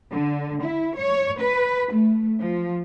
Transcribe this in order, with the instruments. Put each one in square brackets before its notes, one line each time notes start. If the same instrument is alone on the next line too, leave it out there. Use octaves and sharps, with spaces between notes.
[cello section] D3
E4
C#5
B4
A3
F3